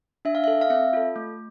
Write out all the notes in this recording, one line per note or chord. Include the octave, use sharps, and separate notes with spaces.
D4 E5
F5
E5
A4
F5
C4 E5
F4 A4
A3